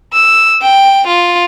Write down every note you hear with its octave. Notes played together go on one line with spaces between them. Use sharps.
E6
G5
F4